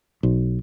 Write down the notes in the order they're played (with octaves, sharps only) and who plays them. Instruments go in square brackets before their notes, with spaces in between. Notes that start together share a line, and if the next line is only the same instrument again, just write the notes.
[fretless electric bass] B1